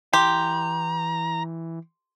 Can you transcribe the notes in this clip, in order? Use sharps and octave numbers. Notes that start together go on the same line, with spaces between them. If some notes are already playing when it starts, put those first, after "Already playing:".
E3 G4 A#5 C6